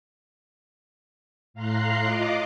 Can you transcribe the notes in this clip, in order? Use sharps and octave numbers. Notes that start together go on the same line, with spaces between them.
A2 F5 A#5 C6 F#6 C7
F4 D#5 D6